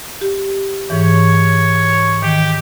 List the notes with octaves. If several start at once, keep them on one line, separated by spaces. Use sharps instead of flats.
G4
G#2 E3 C#5
D#3 G4